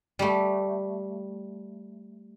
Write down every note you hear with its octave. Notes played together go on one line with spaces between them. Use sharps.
G3 A3